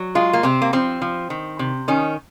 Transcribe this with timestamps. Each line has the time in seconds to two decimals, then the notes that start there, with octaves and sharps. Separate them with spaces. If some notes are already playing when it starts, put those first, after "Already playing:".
Already playing: F#3
0.15 G#3 F4
0.33 A#3
0.43 C3 C4
0.62 A#3
0.73 F3 C4
1.02 F3
1.30 D#3
1.59 C3
1.88 D#3 C#4